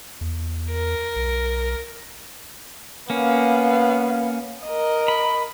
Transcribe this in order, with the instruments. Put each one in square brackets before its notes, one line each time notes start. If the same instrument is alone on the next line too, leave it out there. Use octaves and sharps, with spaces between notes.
[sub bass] E2
[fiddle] A#4
[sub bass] B1
[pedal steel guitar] A#3 C#4 [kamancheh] B3 F5
[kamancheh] A#4 D#5
[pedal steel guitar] B5